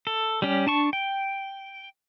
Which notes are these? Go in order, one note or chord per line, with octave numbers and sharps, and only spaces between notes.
A4
G3 C#4 G4
D4 A5 C#6
G5